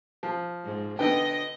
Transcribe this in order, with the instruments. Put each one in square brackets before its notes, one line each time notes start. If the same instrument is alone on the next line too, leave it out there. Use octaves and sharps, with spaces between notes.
[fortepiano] F3
[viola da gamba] G#2
[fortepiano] D3 B3 G5 [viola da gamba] D#5